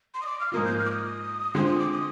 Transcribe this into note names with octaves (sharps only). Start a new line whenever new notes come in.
C6
D#6
D6
F6
G#2 F3 A#3 F4 D#6
G6
F6
D6
D#6
D3 G#3 C4 F4 C6
D#6
D6
D#6